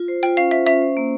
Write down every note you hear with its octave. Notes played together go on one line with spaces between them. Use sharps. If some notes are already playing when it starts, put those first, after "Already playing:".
Already playing: F4
C5
F4 G5
C#4 F5
C5 E5
C#4 E5
C5
A#3